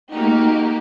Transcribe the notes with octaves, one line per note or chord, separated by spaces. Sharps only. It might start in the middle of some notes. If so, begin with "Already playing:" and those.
A3 A#3 D#4 F#4 G4